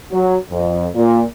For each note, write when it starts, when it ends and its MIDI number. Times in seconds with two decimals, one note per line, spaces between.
0.12 0.36 54
0.50 0.86 41
0.95 1.23 46